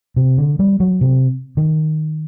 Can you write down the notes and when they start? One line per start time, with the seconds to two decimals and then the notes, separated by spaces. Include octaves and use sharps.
0.16 C3
0.38 D3
0.59 G3
0.80 F#3
1.01 C3
1.57 D#3